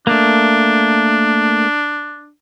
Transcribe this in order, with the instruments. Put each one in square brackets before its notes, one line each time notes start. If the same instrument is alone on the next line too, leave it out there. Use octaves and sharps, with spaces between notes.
[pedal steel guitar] A3 A#3 [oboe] D4